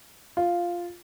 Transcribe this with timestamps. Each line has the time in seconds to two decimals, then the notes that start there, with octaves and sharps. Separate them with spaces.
0.37 F4